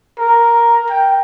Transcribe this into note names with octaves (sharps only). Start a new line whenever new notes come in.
A#4
G5